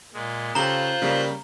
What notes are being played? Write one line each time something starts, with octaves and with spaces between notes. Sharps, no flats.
A#2 G#3
C#3 F4 G4 A4 C5 A#5 F#6 G7
C#3 G3 A#3